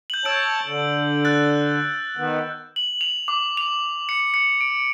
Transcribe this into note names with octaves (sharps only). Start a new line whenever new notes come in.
G6 F#7
C#5 A5 E6 G6 D7
D3
E6 F#6 A6
D#3 B3
F#7
F7
D6
F7
C#7
C#7
D7